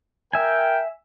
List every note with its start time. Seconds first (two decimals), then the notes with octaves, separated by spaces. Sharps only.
0.33 A#4 E5 G5 G#5